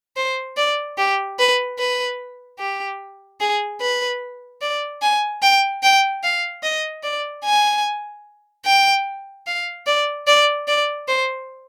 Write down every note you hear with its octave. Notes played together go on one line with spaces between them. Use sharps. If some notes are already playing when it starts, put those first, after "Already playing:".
C5
D5
G4
B4
B4
G4
G#4
B4
D5
G#5
G5
G5
F5
D#5
D5
G#5
G5
F5
D5
D5
D5
C5